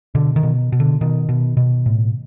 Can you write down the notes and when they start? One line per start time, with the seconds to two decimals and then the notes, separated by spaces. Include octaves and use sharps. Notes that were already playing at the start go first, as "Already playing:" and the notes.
0.15 B2 D3
0.36 D#3
0.43 B2
0.72 B2
0.80 D3
1.01 B2 D#3
1.29 B2
1.57 B2
1.86 A2